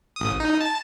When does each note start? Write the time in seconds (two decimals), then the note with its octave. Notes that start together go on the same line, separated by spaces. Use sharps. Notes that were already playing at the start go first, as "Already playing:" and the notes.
0.16 A1 D#6
0.40 D#4
0.61 A5